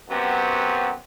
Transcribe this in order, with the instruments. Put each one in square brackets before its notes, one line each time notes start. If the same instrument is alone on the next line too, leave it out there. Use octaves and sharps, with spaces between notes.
[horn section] F#2 F#3 B3 C4 G4